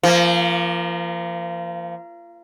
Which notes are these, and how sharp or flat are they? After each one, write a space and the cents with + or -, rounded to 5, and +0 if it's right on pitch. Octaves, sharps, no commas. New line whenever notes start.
F3 -30 A#3 +0